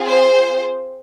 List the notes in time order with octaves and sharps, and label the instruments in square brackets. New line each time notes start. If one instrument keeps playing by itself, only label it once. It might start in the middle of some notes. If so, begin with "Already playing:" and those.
Already playing: [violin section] C4 F4 G#4
C5